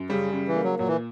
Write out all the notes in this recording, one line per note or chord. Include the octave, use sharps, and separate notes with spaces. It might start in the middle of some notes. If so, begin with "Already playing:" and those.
Already playing: F#2
C#3 G3
C#3
E3
A#3
F#3
A#2 F#3
E3